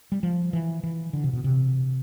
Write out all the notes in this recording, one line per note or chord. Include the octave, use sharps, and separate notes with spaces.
G3
F3
E3
E3
D3
C3
B2
C3